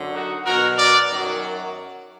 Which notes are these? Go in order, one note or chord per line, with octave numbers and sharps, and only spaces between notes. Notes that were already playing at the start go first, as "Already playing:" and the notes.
Already playing: F#2 D3 F#3
D#4 F#4
B2 F#3 F#4 A#4
A#4 D5
F#2 D#3 F#3